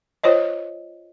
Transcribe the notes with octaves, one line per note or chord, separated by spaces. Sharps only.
F4 C5 C#5 D#5